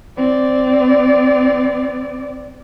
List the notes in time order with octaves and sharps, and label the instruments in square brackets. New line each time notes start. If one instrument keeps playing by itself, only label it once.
[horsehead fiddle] C4 D5